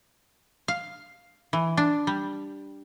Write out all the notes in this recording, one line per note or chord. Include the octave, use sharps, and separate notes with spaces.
F5
E3
D4
G3